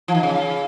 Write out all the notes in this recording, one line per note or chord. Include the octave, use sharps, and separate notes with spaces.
F3
D#3
C#3